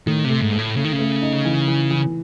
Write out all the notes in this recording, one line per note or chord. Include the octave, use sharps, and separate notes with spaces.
A2 D#3
C3 A3
G#2
A3
A2
C#3 A3
D#3
C#3
A3
D#4
E3
E3
E3